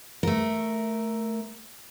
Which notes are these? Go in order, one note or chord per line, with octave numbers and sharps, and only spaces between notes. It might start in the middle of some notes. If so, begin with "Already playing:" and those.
A3 A#4